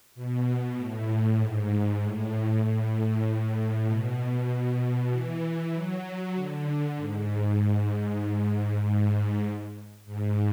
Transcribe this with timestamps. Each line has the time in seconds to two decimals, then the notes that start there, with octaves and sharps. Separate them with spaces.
0.15 B2
0.76 A2
1.38 G#2
2.01 A2
2.63 A2
3.86 B2
5.10 E3
5.73 F#3
6.34 D3
6.97 G#2
8.82 G#2
10.06 G#2